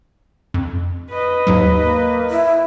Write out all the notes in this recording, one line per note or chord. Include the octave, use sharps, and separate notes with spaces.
F2
B4 D#5
D#2 G#2 F#3
A#3
E4